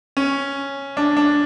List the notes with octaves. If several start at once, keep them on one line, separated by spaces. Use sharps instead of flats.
C#4
D4
D4